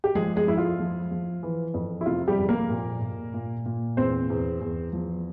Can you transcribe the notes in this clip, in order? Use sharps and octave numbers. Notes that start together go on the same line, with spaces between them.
G4
F3 G#3 G#4
G#3 G#4
F2 E4
F4
F3
F3
E3
F2
E4
C3 F4
G3 G4
F2
A#3 A#4
A#2
A#2
A#2
A#2
E2 C4 C5
E2
E2
F3